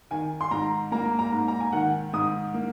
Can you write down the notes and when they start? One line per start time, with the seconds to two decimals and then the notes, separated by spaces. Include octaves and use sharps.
0.11 D#3 G#5
0.41 C6
0.51 G#2 A#5
0.92 A#3 A#5
1.19 A#5
1.33 G#2
1.48 A#5
1.61 G#5
1.73 D#3 F#5
2.13 G#2 D#6
2.54 A#3